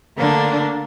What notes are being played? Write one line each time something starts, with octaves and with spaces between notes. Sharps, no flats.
D3 A3 A#3 D4